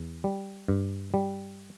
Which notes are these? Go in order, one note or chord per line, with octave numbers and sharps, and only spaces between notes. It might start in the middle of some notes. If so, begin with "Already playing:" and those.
Already playing: E2
G3
G2
G3